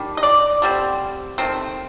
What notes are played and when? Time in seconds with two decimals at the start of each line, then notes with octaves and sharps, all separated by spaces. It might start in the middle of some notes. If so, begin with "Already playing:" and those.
Already playing: D#3 G3 D4
0.17 D#5
0.23 D5
0.62 D3 G3 C4
1.38 D#3 A3 C4